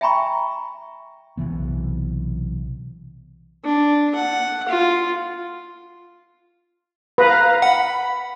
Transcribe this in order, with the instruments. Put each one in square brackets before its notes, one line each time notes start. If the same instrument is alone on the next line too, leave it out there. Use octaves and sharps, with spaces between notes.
[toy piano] E5 G5 G#5 A#5 B5 C#6
[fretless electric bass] B1 C3 E3 B3
[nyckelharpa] D4
F#5
F4
[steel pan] B4 [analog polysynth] F5 A#5
[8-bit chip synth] F#5 [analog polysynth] B5